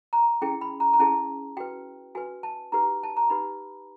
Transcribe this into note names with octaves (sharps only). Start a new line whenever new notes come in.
A#5
C#4 E4 G#4 G5
B5
A#5
A#5
C#4 E4 G#4 A5
F#4 B4 G5
F#4 B4 G#5
A5
D#4 G4 B4 A#5
A5
A#5
D#4 G4 B4 B5